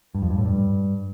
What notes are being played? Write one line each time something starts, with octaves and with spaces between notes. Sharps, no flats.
G2
F2
G2
A2
G2